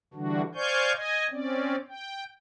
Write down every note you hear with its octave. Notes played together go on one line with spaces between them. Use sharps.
D3 E3 G3 D4 F#4
C5 D5 F5 G#5 C#6 G6
D#5 G#5
C4 C#4 D5
G5